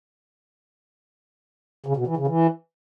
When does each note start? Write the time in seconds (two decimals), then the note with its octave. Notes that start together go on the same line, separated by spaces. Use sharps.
1.86 C#3
1.97 B2
2.07 E3
2.17 C#3
2.27 E3